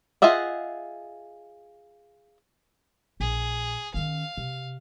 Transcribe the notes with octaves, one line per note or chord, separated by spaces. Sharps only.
F4 G#4 D#5 E5 F#5
A#1 G#4
D#3 C#4 F5
C3